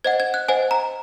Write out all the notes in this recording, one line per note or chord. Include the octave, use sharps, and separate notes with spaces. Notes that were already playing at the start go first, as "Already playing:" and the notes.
C5 D#5 F#5 G#6
G#6
F#6
C5 D#5 F#5 G#5
A#5